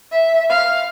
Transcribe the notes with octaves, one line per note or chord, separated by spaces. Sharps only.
E5
F5